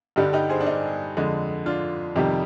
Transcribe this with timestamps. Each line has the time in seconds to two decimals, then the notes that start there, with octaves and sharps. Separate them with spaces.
0.16 G2 D3 G3 D#4 G4
0.33 D#4 G4
0.49 G#4 C5
0.60 D4
0.67 D#4
1.17 F2 D3 G#3
1.66 D4 F4
2.16 F2 C3 D#3 G3 D#4 G4